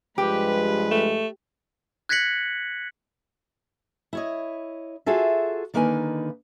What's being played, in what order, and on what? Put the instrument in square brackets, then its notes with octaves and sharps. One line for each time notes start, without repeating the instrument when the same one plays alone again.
[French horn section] G2 F3 G#3 [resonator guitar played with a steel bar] G4 [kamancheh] B4
[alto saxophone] A3
[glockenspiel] F#6 G#6 A#6 B6 C#7 F#7
[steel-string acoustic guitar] E4 C#5 D#5
F4 F#4 G#4 A4 E5
D3 D#3 A#3 D#4 B4 G#5